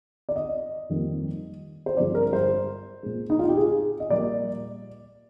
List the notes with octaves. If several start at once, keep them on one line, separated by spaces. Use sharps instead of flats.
D5
D#5
F2 D#3 G3 A#3
C5
G2 D3 F3 G#3 D5
A#4
A#4
C5
A#2 G#3
D#4
F4
G4
G#4
D#5
A#2 G3 A#3 D5